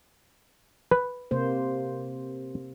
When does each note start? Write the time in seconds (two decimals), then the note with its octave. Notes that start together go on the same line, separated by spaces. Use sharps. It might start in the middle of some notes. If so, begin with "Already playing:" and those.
0.91 B4
1.31 C3 A#3 C5